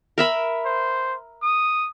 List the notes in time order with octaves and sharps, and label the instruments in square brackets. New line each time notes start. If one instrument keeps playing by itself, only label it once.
[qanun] A#4 E5 B5
[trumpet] C5
D#6